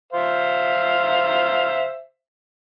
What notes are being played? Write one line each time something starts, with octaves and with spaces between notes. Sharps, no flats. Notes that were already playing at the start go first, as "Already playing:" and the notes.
C5 E5 F5